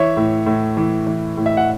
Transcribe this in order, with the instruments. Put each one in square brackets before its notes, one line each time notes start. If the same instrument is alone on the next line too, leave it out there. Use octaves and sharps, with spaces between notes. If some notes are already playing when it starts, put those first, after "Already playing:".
Already playing: [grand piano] E3 C#5 E5
A2
A2
E3
E3
A2
E5
F#5